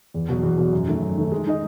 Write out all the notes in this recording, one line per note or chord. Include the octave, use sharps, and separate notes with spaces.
E2
B2 F#3
E2
B2 F#3
F#2
D#3 A3
F#2
D#3 A3
G#3
D#4 G#4 D#5